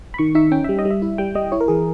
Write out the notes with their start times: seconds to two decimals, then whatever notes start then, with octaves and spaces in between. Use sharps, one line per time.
0.14 B5
0.18 D#3 C#6
0.35 D#4 E5
0.51 C#4 G5
0.64 G3 E5
0.79 D#5
0.85 G3
0.90 E5
1.02 E4
1.18 G3 G5
1.35 G3 D#5
1.52 E4 C#5
1.60 A#4
1.68 E3 G#4